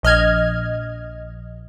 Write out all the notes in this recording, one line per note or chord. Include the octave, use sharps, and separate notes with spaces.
A#1 D#5 F6 G#6